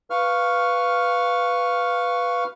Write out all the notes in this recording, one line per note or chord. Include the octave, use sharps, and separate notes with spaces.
B4 F5 C#6 F6